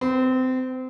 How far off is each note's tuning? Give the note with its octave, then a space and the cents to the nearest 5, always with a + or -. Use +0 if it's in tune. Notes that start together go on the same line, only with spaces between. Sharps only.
C4 -25